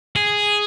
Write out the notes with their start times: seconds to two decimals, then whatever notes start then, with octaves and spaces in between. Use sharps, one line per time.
0.16 G#4